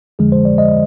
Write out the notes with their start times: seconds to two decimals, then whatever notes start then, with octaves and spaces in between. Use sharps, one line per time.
0.19 F2 D3 F3 G#3 G#4
0.32 C5
0.45 D5
0.58 D#5